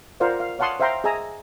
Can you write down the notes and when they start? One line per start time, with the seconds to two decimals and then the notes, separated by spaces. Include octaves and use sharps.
0.20 F4 A#4 C5 D5 F5 F#5
0.40 F5
0.59 C#5 F5 F#5 A5 C6 D#6
0.80 C5 E5 F5 G5 A#5 C6
1.04 G#4 D#5 E5 G#5 A#5 E6